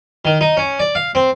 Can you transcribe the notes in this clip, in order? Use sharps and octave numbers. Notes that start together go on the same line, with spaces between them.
D#3
D#4
C#4
D5
F5
C4